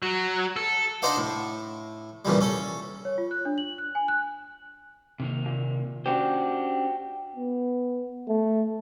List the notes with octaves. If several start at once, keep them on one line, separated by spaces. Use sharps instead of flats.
F#3
A4
D4 D#4 C5 D5 F5 F#5
A2
E2 A#2 C#3 G3
C#4 A4
C#5
F4
F#6
D4
F#7
F#6
G#5
F#6
C3 D#3 A#3
A#2
C#4 D4 F#4 G4 C5
B3
A3